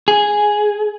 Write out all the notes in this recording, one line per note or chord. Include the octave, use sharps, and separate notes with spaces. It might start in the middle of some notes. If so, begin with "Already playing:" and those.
G#4